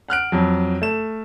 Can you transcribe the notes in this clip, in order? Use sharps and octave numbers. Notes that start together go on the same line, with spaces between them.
F#5 F6 F#6 D7
F2 F#3
A3 E7